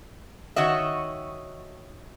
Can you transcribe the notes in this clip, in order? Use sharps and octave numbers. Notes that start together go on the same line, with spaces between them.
D#3 F#4 C#5 D#5 E5